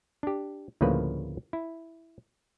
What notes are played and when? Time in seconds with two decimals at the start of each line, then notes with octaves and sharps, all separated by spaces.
0.23 D4 G4
0.81 D2 A2 C#3 F3 A#3 B4
1.53 E4